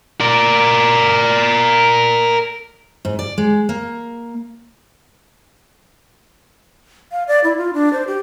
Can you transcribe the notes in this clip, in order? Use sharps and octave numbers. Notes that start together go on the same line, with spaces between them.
A#4 D5
G#2
D5
G#3
A#3
F5
D5
E4
F4
D4
C5
G4